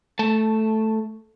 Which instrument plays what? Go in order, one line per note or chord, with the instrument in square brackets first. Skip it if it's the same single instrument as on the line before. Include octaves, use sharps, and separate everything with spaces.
[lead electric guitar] A3 A5